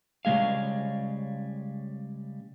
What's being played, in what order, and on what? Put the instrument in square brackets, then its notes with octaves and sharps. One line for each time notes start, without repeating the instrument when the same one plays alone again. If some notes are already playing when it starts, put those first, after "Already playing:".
[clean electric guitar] C#3 G3 G#3 G#4 F5